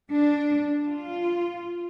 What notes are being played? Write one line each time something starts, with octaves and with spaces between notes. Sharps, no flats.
D4
F4